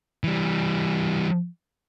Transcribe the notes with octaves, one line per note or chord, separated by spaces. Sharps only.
E3 G3